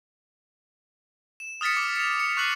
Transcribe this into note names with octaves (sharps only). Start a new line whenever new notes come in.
E7
D#6 F6 A6 B6 C#7
D6
C#7 F7
C#7
C#6 F#6 C7 F#7